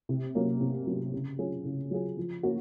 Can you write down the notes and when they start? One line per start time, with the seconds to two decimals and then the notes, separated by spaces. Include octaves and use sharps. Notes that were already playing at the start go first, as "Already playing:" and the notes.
0.09 C3
0.35 F#3 A#3 C#4
0.61 C3
0.87 F#3 A#3 C#4
1.13 C#3
1.38 F#3 C#4 F4 G#4
1.65 C#3
1.91 F#3 C#4 F4 G#4
2.17 F3
2.43 A#3 C#4 F#4